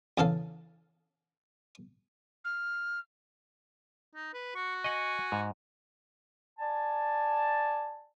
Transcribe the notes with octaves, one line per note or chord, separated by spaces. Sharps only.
E2 C#3 A4 F5
F6
D#4
B4
F#4 C#6
D#5 F#5 G#5 C#6
G#2
D5 G#5 A5